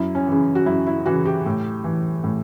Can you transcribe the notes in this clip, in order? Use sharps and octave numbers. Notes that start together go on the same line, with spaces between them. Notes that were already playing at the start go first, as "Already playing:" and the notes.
Already playing: F#2 E4
C#4
C#3 E3
F#4
F#2 E4
E4
C#3 E3 F#4
G4
A2
E3
A2